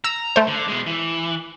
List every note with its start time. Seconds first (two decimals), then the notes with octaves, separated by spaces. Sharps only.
0.04 A#5 E6
0.36 A3 C5
0.48 D3
0.68 B2 G#3
0.86 E3